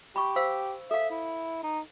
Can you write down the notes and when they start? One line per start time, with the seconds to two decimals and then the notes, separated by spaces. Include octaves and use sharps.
0.16 G4 B5 C#6
0.36 C5 F5 E6
0.91 A4 E5 F5
1.11 E4
1.63 D#4